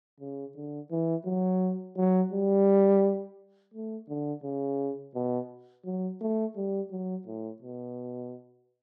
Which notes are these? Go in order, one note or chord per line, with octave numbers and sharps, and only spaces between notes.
C#3
D3
E3
F#3
F#3
G3
A3
D3
C#3
B2
F#3
A3
G3
F#3
A2
B2